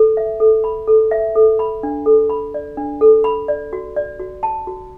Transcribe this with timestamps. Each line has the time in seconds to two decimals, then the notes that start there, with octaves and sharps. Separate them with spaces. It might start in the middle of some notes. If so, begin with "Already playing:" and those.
Already playing: A4
0.17 E5
0.40 A4
0.64 B5
0.87 A4
1.11 E5
1.36 A4
1.59 B5
1.83 D4
2.06 A4
2.30 B5
2.54 D5
2.77 D4
3.01 A4
3.24 B5
3.48 D5
3.73 F#4
3.96 D5
4.20 F#4
4.43 A5
4.67 F#4